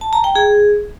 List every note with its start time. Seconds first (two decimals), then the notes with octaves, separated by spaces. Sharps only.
0.01 A5
0.13 A#5
0.24 G5
0.35 G#4